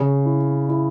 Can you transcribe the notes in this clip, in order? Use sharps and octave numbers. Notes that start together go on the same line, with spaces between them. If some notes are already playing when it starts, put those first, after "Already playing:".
Already playing: C#3
E4
E4